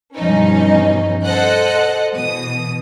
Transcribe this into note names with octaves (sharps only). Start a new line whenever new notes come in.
G2 B2 E3 F3 C#4 D#4
A4 C5 D#5 F#5 F#6
B2 E3 D#6